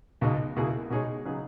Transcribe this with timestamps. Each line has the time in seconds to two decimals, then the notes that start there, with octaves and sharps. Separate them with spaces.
0.21 C#2 B2 G#3 D#4
0.56 C#2 B2 A#3 E4 G#4
0.90 B2 G#3 D#4 G#4 C#5
1.25 C#3 F#3 B3 D#4 G#4